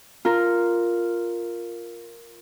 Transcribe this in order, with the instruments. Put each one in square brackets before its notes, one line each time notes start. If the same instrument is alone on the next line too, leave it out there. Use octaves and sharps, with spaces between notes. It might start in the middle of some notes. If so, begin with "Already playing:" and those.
[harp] F4 A#4